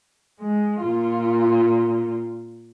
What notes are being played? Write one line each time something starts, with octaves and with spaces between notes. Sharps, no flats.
G#3
A#2 F4